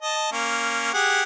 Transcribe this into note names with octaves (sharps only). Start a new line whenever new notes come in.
D#5 A5
A#3 C#4
G4 G#4 F#5